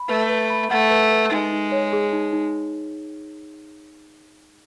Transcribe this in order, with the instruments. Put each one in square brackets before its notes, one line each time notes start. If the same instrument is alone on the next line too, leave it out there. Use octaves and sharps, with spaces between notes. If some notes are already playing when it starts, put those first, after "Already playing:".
Already playing: [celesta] B5
[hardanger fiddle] A3 [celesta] B4
[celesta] B4
B5
[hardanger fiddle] A3 [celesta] F#5
[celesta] B4
B4
[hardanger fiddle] G#3 [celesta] D#4
[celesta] D#4
C#5
G#4
D#4
D#4